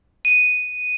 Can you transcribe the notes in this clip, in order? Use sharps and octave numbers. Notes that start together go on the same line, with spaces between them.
D#7